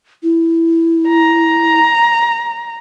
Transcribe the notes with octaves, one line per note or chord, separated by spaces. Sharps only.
E4
A#5